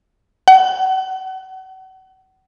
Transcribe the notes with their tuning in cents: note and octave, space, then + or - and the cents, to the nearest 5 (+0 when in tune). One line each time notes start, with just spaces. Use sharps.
F#5 +35